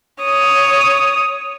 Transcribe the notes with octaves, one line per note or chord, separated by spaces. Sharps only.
C#5 D#6